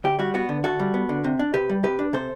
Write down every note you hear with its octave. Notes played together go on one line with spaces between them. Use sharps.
D2 G4
G3 F#4
B3 F#4
D3
D2 F#4 A4
G3
B3
D3
C3
D4
C3 G4 B4
G3
C3 G4 B4
D4
C3 A4 C5